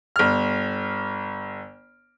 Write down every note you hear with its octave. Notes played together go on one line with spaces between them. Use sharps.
G1 F6